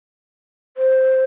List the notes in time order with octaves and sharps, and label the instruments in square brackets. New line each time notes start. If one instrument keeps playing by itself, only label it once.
[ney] C5